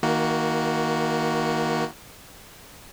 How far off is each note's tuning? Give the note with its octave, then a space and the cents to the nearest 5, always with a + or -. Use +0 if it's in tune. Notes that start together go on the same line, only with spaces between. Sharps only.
D#3 +30 A#3 +0 F#4 +0